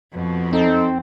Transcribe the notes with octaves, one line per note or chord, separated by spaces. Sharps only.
F2 B2
C4 D#4 A4